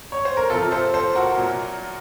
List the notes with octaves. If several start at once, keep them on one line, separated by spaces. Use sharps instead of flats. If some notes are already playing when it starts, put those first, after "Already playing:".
C#5
C5
A#4
C3 F3 F4 A4
A4 C5
A4 C5
F#4 A#4
A#2 F#3